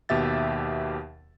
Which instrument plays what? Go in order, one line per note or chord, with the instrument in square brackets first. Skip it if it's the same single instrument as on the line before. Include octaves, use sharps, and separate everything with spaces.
[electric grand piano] D#2 B2 G4 E5 A6